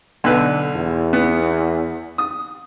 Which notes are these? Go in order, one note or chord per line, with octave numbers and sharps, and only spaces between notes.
B1 D3 B4
E2
B3
D#6